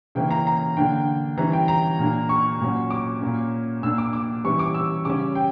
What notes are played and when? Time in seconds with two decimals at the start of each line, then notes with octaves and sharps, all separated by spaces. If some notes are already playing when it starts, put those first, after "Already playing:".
0.15 C#3 E3 A#3 C#4 G5
0.31 A#5
0.47 A#5
0.77 D3 A#3 D4 G5
1.37 E3 G3 C#4 A#5
1.53 G5
1.68 A#5
1.99 A#2 A#3 D4
2.29 C#6
2.61 A#2 F#3 C#4
2.91 D6
3.21 A#2 A#3 C#4
3.83 A#2 A#3 D4 E6
3.98 D6
4.13 D6
4.44 E3 G3 C#4 C#6
4.59 D6
4.74 E6
5.05 C#3 G3 C#4 D6
5.35 G5